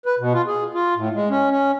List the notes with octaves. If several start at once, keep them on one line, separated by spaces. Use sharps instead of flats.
B4
B2
F4
G#4
F4
A2
G#3
C#4
C#4